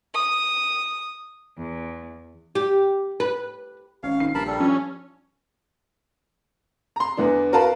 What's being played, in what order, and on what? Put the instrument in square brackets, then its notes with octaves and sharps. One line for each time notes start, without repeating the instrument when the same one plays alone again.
[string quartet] D#6
E2
[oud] G4
B4
[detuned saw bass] G#1 [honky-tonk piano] C#4 [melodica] F5
[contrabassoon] D#3 [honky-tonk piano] C7
[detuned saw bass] A#1 [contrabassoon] G2 [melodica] A#4 A5 B5
[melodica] G3 A4
[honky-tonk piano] F3 [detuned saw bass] C#4
[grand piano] A#5 C6
E2 D3 E3 B3 D4
F#4 A#4 B4 F5 A5 B5